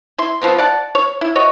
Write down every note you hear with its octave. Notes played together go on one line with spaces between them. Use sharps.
E4 C6
B2 F3 B3 C4
D5 F#5 A5
C#5
E4
F#4 C#5 D#5